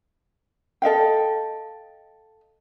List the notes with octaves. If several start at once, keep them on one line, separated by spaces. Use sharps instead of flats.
A4 D#5 F5 G5